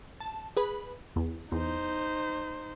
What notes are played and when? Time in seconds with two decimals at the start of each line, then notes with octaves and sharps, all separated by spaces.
0.20 A5
0.57 G#4 B4 B5
1.16 E2
1.52 E2 D#4 C5